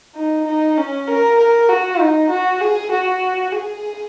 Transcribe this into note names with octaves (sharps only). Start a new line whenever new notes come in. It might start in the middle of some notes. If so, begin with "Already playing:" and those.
D#4
D#4
C#4
A#4
A#4
F#4
D#4
F#4
G#4
F#4
G#4